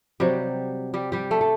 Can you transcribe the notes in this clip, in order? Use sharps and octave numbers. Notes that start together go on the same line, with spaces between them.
C3 F#3 G3 G4
G3 G4
G3 G4
A3 A4
A4